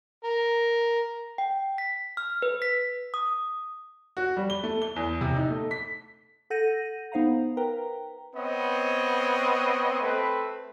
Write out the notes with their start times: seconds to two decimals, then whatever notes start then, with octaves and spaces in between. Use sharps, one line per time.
0.24 A#4
1.38 G5
1.78 B6
2.17 F6
2.42 B4
2.62 B6
3.14 D#6
4.17 F#4
4.37 G3
4.50 G7
4.63 A3
4.82 G7
4.96 E2
5.21 C3
5.36 D#4
5.50 A3
5.71 B6
6.50 A4 F#5 G6 A#6 D#7
7.12 B3 D#4 C5 F5 F#5 A#5
7.57 A#4 B4 G5 A#5
8.35 B3 C4 C#5 D#5
10.02 A3 C4 B4